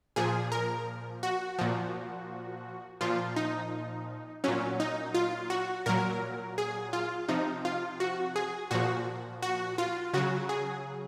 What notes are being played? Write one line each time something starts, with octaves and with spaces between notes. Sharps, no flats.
A#2 F3 G#4
A#4
F#4
A#2 F3
A#2 F3 F4
D#4
A#2 F#3 C#4
D#4
F4
F#4
A#2 F#3 A#4
G#4
F4
C3 F3 D#4
F4
F#4
G#4
A#2 F3 F#4
F#4
F4
C#3 F#3 F#4
G#4